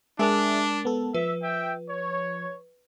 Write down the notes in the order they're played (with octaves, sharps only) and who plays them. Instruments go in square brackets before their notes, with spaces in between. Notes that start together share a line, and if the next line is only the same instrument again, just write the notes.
[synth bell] G#3 A#4 F7 [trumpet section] D4 [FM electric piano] G#4 E5
[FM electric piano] B3 A4
[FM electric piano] F3 [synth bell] B4 [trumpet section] E5
[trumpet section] E5 G5
C#5